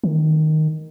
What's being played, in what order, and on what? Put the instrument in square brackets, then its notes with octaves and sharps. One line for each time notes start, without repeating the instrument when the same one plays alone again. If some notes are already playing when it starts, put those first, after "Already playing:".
[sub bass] D#3